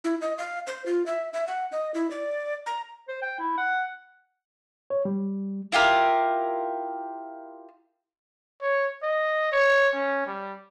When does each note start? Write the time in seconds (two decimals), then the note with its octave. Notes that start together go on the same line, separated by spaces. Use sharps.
0.04 E4
0.21 D#5
0.38 F5
0.67 C5
0.86 F4
1.06 E5
1.33 E5
1.47 F#5
1.72 D#5
1.94 E4
2.11 D5
2.66 A#5
3.08 C5
3.22 G5
3.40 E4
3.58 F#5
4.90 C#5
5.05 G3
5.72 E4 F4 G4 A#4
8.61 C#5
9.03 D#5
9.52 C#5
9.94 C#4
10.27 G3